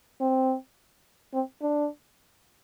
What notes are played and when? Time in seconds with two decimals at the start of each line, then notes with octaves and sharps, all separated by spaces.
0.20 C4
1.33 C4
1.62 D4